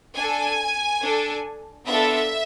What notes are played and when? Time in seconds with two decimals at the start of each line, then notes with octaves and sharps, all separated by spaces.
0.16 D4 A4 G#5
1.02 D4 A4
1.87 B3 D4 F4 A4 E5